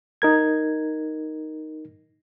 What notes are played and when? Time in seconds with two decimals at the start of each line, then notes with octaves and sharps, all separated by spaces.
0.22 D#4 A#4 G#6